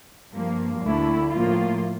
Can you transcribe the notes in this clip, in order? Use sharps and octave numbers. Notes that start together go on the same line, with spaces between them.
G2 F3 A#3
D2 D3 A3 E4
A2 F3 A#3 F4